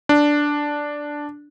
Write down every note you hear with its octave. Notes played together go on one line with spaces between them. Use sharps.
D4